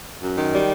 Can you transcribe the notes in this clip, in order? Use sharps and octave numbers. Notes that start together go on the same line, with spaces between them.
F#2
D#3
G3